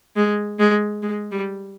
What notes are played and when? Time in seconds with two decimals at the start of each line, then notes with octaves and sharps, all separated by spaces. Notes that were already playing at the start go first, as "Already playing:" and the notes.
0.16 G#3
0.59 G#3
1.02 G#3
1.31 G3